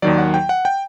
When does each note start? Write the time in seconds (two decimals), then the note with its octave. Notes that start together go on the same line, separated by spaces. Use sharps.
0.02 D#2 D#3 F#3 D5
0.18 F#5
0.34 G5
0.49 F#5
0.65 G5